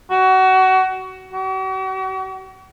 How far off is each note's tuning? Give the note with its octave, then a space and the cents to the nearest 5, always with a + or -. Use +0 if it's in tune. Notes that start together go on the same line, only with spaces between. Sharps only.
F#4 +25
F#4 +45